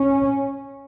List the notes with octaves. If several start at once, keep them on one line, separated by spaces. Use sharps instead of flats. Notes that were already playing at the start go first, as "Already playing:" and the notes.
Already playing: C#4